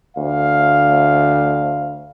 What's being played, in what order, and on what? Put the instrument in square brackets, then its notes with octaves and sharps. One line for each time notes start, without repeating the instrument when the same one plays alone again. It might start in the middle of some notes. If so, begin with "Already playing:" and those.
[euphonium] D2 [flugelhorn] F5